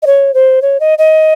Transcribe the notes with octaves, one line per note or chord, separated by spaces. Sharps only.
D#5
C#5
C5
C#5
D#5
D#5